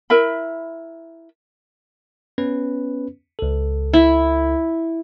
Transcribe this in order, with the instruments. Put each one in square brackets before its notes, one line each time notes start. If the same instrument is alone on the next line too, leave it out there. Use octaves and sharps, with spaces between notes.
[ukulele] E4 A#4 E5 B5
[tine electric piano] B3 C#4 B4
C#2 A4
[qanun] E4